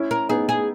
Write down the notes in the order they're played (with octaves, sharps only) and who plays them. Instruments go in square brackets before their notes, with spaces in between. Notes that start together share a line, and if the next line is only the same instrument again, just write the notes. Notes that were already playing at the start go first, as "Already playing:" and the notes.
Already playing: [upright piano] C#4 E4
[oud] A#4
[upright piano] B3 D#4 [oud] G#4
[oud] G#4